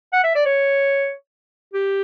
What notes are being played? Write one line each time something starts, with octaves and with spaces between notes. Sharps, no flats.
F#5
E5
D5
C#5
G4